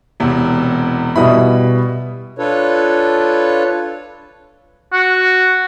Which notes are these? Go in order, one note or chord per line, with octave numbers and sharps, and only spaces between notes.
E1 E2 C3
B2 G3 E4 B5 D#6
D4 F4 A4 B4 C#5
F#4